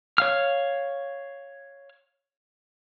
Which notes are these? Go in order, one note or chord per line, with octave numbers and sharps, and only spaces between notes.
C#5 F5 F6